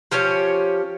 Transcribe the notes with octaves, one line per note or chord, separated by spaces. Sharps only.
F3 C#4 G4 C#5